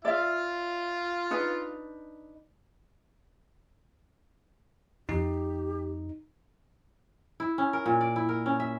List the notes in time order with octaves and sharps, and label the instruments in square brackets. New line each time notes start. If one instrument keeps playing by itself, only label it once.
[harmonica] F4 F5 [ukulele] D5 E5
[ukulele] D4 D#4 B4
[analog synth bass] F2 [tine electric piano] D#4 [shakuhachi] G4
[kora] E4
C#4
A#4
A#2
D5
E4
A#4
C#4
E5